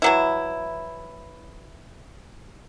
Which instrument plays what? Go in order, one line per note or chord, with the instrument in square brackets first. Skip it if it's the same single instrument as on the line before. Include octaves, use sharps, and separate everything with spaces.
[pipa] E3 F#3 E4